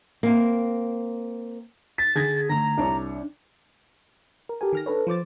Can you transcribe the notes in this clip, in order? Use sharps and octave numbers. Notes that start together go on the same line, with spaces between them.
A#3 C4
A6 B6
D3 G#4 G#6 A#6
D3 A3 A#5 A#6
C2 D4 C#5
A#4
G4 A4 A#4 G#5
D#3 F6 A#6
D4 A4 B4 C#5
F3 C5 D6 A6